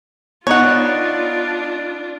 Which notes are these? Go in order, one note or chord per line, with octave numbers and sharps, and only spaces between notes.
B3 D4 D#4 F4 C#5 F#5